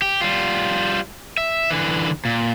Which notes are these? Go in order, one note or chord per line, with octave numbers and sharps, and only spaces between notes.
G4
G3 F4
E5
D3 E3
A#2